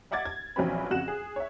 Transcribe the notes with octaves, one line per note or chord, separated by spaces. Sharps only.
D#5 E5 F#5 D6 G#6 A6
G#6
A#1 E3 F#3 C4 C#4 B5
F2 C#3 F#4 F#5 F#6 E7
G#4
C#5 E5